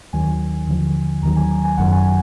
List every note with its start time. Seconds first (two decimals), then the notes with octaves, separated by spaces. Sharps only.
0.13 D#2 D#3 F#3 G#5
0.67 D#2 D3 F3
1.22 D#2 D#3 F#3 A#5
1.36 G#5
1.64 G#5
1.77 G#1 F#2 D#3 F#3 F#5
1.92 G#5
2.05 G#5